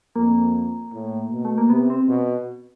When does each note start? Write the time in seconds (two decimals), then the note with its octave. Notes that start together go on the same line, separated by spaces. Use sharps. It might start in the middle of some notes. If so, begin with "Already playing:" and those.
0.15 F2 A#3
0.93 A2
1.32 B2
1.45 A3
1.58 A#3
1.70 C3 B3
1.90 C4
2.08 B2